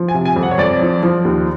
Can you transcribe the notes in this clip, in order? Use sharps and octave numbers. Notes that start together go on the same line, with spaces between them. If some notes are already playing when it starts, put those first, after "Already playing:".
Already playing: F3
G#5
C3
G#5
F2
F#5
C#5
F2 D5
F3
F3
D#2